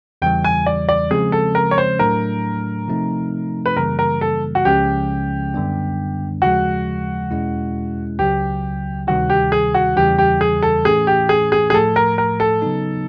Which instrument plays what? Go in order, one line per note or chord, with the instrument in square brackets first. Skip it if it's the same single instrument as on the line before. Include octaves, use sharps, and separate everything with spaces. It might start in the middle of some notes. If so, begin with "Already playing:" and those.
[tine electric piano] E2 C#3 E3 G3 [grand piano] G5
[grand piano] G#5
D5
D5
[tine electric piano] C#3 F3 G#3 C4 [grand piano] G#4
[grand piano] A4
A#4
C#5
C5
[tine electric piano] A2 F#3 A3 D4 [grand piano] A#4
[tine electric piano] C3 F3 A3 C4 D#4
[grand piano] B4
[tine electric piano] F#2 C#3 E3 G3 A#3 [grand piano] A#4
[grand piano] A#4
A4
F#4
[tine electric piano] C#2 C#3 F3 G#3 C#4 [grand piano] G4
[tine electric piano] F#2 D3 G3 B3 D4
[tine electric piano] D#2 C#3 F3 G#3 [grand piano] F#4
[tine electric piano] E2 B2 G#3 C#4 E4
[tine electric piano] C#2 C#3 F#3 [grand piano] G4
[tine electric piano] D2 C3 D#3 G3 [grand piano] F#4
[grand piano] G4
G#4
F#4
[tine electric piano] E2 C#3 E3 G3 [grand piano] G4
[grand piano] G4
G#4
A4
[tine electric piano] A2 E3 A3 C#4 [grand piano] G#4
[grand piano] G4
G#4
G#4
G#4
[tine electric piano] A2 F3 A3 [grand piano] A4
[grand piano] A#4
A#4
A4
[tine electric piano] C#3 F#3 B3 D#4